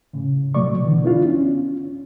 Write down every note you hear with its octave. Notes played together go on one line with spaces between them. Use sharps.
A2 C#3
B2 F#3 A3 D5 C#6 D6
D3 E3 B3
B3 D4 E4 F4
C#4